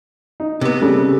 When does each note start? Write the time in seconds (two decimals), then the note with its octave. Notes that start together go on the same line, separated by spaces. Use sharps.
0.40 D#4
0.61 C3 B3
0.82 C#3 G3 A4